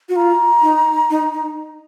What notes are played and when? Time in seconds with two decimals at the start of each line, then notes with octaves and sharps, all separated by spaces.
0.09 F#4
0.16 F4 A#5
0.62 D#4
1.10 D#4
1.33 D#4